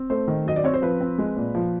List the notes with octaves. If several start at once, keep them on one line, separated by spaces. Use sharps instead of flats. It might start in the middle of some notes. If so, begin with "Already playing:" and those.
Already playing: C4
A3 C5
D#3
F#3 D#5
D5
C4 C#5
C5
F3 B4
C4
G#3
A#2
F3